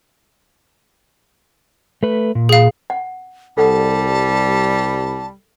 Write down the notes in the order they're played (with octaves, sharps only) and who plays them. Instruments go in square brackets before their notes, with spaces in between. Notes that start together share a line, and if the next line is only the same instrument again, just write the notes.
[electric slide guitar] A3 B4
A#2
[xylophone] G#4 F5
[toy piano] F#5
[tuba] C2 [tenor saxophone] G3 [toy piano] A4 F#5 [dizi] A5